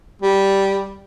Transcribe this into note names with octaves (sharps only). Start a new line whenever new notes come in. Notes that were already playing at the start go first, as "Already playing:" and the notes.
G3